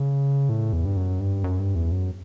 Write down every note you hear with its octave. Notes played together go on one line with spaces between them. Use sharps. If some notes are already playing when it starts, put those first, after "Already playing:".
Already playing: C#3
A2
E2
G2
F#2
G2
F#2
G2
E2
F#2